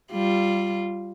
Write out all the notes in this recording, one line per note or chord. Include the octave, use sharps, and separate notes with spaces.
G3 F4